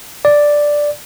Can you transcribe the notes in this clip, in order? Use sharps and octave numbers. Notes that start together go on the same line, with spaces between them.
D5